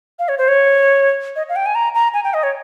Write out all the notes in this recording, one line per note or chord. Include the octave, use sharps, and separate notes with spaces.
F5
C#5
C5
C#5
D#5
F5
G5
G#5
A#5
A#5
G#5
G5
D#5
C#5